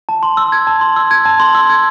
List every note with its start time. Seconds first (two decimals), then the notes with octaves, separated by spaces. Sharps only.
0.09 A5
0.23 C6
0.37 E6
0.52 G#6
0.67 A5
0.81 C6
0.96 E6
1.11 G#6
1.25 A5
1.40 C6
1.55 E6
1.70 G#6